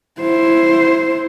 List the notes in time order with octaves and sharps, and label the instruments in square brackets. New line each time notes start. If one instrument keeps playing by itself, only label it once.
[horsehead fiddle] E4 C5